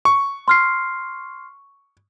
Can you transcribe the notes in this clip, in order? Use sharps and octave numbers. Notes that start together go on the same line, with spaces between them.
C#6
C6 F6 C7